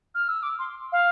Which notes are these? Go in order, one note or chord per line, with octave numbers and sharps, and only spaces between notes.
F6
E6
D6
C6
F5